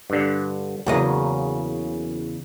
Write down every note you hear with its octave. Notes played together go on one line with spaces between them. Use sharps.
G2 D3
E2 C#3 F#3 A#3 D#5